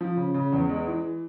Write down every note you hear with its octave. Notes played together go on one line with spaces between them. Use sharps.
F3
C#3
C#3
E2
G#3
E3